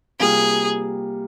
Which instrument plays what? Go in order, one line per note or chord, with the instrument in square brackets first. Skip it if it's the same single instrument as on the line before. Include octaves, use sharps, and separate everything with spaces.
[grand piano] C3 G3 A#3 F4 [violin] G#4